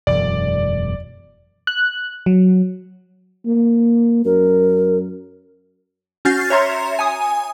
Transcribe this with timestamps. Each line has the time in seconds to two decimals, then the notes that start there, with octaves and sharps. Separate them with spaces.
0.07 E1 F#2 D5
1.67 F#6
2.26 F#3
3.46 A#3
4.25 F#2 A#4
6.25 C#4 F#4 F6 G6 A6 C7
6.50 C#5 E5 A#5 C6
6.99 G#5 D#6